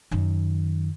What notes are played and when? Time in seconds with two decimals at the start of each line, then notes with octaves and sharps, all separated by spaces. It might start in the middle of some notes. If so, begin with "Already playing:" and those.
0.11 F#2 D#3